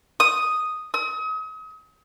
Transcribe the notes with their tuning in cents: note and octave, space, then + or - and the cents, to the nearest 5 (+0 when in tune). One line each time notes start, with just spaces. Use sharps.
D#6 +0
D#6 +40